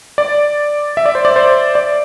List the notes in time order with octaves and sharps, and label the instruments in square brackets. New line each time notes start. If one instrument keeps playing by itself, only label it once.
[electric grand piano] D5
E5
D5
C5
D5
C5
D5